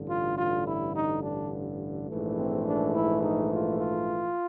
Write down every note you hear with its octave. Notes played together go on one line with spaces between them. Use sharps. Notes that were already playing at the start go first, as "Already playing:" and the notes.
Already playing: A1 G2 D3
F4
F4
E4
D#4
D4
A#1 G#2 E3 A3
C4
D4
E4
D#4
F4
F4